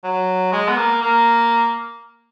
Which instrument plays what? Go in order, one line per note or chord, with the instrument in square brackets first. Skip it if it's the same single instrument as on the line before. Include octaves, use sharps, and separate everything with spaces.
[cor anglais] F#3
G#3
B3
A#3
A#3